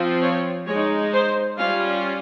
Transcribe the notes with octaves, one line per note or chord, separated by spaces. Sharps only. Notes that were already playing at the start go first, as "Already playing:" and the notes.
Already playing: F3 C4 F4
C#5
G#3 D#4 C#5
C5
G3 C#4 F4 F5